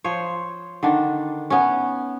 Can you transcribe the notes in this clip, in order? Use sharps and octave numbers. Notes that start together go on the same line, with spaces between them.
F3 C5 C#5
D3 D#3 D4
B3 C#4